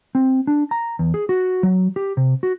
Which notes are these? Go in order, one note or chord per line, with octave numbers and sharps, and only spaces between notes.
C4
D4
A#5
E2
G#4
F#4
F#3
G4
C3
F#4